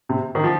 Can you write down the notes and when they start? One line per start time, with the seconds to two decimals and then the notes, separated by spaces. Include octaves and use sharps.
0.09 C3
0.35 D#3
0.44 F3